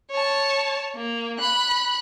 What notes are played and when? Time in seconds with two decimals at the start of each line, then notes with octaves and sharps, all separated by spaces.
0.10 C#5 A5
0.95 A#3
1.39 B5 F#6